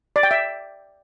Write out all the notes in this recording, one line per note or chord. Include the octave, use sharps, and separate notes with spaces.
D5
G5
E5